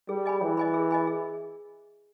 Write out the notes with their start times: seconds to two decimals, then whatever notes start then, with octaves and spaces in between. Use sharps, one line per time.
0.09 G3 G#4
0.26 D#5 G#5 B5
0.41 E3 G#4
0.57 D#5 G#5 B5
0.74 G#4
0.91 D#5 G#5 B5
1.07 G#4